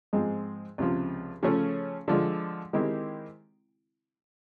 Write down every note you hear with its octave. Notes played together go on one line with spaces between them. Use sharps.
G#2 F3 G#3 C4
C#2 C3 F3
C#3 F3 A3 C#4
D3 F3 G#3
D#3 G#3 C4 E4 G4